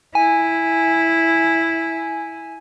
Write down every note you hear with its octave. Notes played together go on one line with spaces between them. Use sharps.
E4 G#5